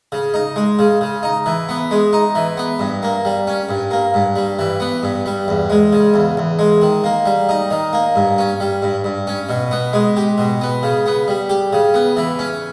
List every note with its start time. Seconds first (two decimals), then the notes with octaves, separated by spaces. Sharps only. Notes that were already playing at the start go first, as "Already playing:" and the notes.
0.12 C#3
0.34 D#4
0.56 G#3
0.79 C#3
1.01 C#3
1.23 D#4
1.46 E3
1.69 B3
1.91 G#3
2.13 D#4
2.35 E3
2.57 B3
2.79 G2
3.03 A#3
3.25 G3
3.47 C#4
3.69 G2
3.91 A#3
4.14 G2
4.36 G3
4.59 E3
4.80 B3
5.03 G2
5.26 G3
5.48 E2
5.70 G#3
5.93 C#3
6.14 E2
6.37 E2
6.59 G#3
6.82 D#3
7.04 A#3
7.26 G3
7.49 D#4
7.70 D#3
7.93 A#3
8.15 G2
8.38 C#4
8.60 G3
8.82 G2
9.04 G2
9.27 C#4
9.49 B2
9.71 B3
9.93 G#3
10.17 G4
10.38 B2
10.61 B3
10.83 C#3
11.06 B3
11.28 G3
11.50 G4
11.73 C#3
11.94 B3
12.17 E3
12.39 C#4